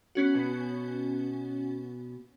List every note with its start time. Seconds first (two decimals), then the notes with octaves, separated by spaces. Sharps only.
0.15 B3 C#4 F#4
0.35 B2